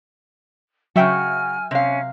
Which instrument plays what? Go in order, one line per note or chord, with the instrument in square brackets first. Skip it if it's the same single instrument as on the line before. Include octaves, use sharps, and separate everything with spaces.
[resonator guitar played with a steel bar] C#3 F#4 [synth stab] F#3 E5 G5 [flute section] G#5 F6
[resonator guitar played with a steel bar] C3 F5 [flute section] C#4